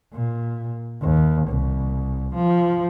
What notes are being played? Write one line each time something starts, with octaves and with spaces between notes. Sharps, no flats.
A#2
D#2
C2
F3